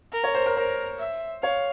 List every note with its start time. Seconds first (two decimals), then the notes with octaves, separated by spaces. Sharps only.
0.12 A#4
0.24 C#5
0.34 C5
0.46 A#4
0.57 A#4 C5
0.99 E5
1.42 C#5 F5